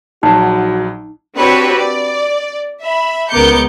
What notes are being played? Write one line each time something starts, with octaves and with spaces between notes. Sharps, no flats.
A#1 F#3 D#4 F#4
C4 D4 F#4 G4 B4 C#5
D5
E5 B5
C#2 B3 A#4 D6 G6 C#7